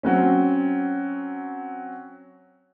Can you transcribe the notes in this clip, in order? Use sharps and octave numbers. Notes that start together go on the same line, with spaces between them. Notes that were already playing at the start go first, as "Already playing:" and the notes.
F#3 C4 C#4